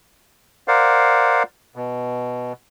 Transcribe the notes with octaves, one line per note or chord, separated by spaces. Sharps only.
A#4 C5 D5 F5 F#5
B2